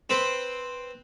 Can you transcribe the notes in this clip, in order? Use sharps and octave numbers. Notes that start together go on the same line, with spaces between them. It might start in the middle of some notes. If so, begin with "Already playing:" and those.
C4 B4